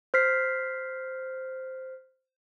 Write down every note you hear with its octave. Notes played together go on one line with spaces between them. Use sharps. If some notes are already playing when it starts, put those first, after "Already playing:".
C5 F6 B6 C7